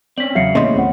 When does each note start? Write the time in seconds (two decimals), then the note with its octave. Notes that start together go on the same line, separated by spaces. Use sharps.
0.18 C4 C#4 D5 B6 F#7
0.35 E2 C#3 F#3 F#4 E5 F5 C7 C#7
0.55 E2 A2 C#3 A#3 D#5 C6
0.76 D2 C4 C#5 F#5